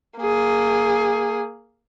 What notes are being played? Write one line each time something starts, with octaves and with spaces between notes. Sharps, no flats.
A#3 G#4